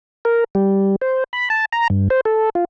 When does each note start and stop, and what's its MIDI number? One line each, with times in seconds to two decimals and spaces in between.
0.25 0.44 70
0.55 0.96 55
1.01 1.24 72
1.33 1.49 83
1.50 1.65 81
1.72 1.88 82
1.90 2.08 43
2.10 2.21 72
2.25 2.49 69
2.55 2.65 65